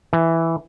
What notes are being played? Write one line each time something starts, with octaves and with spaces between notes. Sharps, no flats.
E3